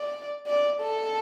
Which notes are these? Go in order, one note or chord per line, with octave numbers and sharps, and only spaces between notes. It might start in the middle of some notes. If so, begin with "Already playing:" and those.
Already playing: D5
D5
A4